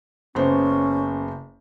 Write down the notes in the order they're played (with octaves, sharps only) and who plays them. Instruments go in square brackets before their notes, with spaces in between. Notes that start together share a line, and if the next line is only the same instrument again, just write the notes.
[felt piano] F#1 B3 C5 [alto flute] C#4